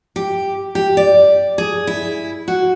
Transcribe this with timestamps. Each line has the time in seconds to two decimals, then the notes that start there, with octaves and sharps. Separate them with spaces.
0.16 G4
0.75 G4
0.97 D5
1.58 G#4
1.87 E4
2.48 F#4